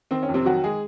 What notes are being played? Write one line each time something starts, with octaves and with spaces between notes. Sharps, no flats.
D#3 C4
C#4
F2
C3 C4
D#3 F#3 F#4
G#3 G#4